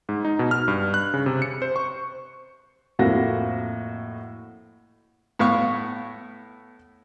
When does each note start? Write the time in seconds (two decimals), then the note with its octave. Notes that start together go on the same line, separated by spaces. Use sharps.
0.09 G#2
0.25 D#4
0.39 B2
0.51 F6
0.68 G2
0.94 F#6
1.14 C#3
1.26 C3
1.42 C#7
1.62 C5
1.76 C#6
2.99 F2 A2 A#3 C4 F#4 A#6
5.39 A2 B3 F5 C#6